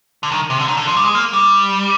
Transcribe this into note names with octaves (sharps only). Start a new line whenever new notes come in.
D3
D#3
C3
D3
D#3
D3
F3
G3
G#3
A#3
G3